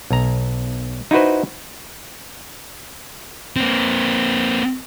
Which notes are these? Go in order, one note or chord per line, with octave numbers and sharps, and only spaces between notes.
B1 A#5
D#4 E4 F#4 B4 C5
A#3 C4